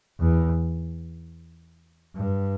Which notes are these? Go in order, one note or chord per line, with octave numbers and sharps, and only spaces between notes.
E2
G2